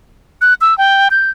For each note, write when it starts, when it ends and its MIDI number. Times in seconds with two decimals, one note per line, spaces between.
0.41 0.54 90
0.61 0.77 88
0.78 1.09 79
1.11 1.30 91